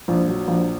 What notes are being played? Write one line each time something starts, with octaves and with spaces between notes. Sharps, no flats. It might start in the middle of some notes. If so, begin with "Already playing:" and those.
A#1
F#3
A#1